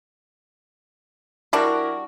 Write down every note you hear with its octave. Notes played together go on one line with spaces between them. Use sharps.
G3 D4 E4 F#4 A#4